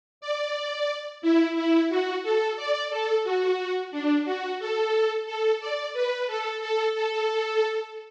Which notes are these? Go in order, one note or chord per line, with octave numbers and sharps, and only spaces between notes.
D5
E4
E4
F#4
A4
D5
A4
F#4
D4
F#4
A4
A4
D5
B4
A4
A4
A4